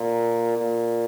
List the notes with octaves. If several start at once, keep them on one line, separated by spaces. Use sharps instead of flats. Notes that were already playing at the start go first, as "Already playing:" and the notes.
Already playing: A#2
A#2